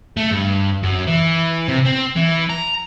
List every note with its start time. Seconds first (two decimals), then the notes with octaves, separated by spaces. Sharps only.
0.17 A3
0.31 G2
0.83 F#2
1.08 E3
1.68 C3
1.85 C4
2.16 E3
2.49 A#5